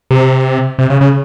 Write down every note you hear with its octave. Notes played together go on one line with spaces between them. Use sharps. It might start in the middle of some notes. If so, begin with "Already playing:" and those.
C3
C3
C#3
C#3